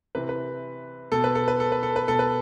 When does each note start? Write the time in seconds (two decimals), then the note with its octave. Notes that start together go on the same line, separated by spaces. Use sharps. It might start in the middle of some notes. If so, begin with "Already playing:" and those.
0.15 C3 E3 B4
0.29 B4
1.12 B2 A4
1.24 B4
1.35 A4
1.48 B4
1.60 A4
1.72 B4
1.83 A4
1.96 B4
2.08 B2 A4
2.19 B4